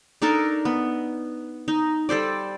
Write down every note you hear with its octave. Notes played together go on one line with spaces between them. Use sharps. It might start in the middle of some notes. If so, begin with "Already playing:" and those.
D4 D#4 A4 A#4
B3
D#4
G3 A4 C5 D5